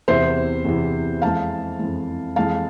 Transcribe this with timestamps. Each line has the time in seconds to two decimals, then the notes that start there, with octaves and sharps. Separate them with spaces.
0.08 E2 C3 E3 C5 E5
0.65 E2 C3 E3
1.22 F2 E3 G#3 F5 A5
1.79 F2 E3 G#3
2.36 F2 E3 G#3 F5 A5